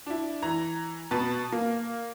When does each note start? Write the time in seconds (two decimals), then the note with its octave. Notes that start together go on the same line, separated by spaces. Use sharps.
0.06 D4 E4
0.42 E3 A#5
1.11 B2 B4 A5
1.52 A#3